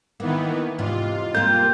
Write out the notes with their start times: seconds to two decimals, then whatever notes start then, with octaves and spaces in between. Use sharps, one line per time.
0.20 D#3 E3 A#3 B3
0.78 E2 G#2 C3 F4
1.35 C3 A#3 A#4 G6